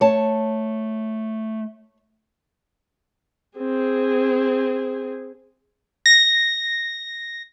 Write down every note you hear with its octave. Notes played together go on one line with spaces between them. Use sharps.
A3 C#5 A5
C4 G#4
A#6